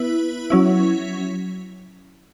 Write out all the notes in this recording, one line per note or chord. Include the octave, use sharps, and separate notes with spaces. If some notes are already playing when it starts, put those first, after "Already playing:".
Already playing: B3 E4 B4
F#3 C#4 E4